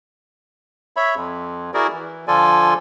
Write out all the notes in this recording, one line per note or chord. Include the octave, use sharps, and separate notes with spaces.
C#5 E5 B5
F2
E4 F#4 G#4 A#4 D5
E3
D3 F3 F4 A4 D5 G#5